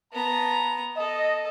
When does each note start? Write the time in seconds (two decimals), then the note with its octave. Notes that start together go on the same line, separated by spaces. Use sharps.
0.13 B3 A5 A#5
0.97 A4 D#5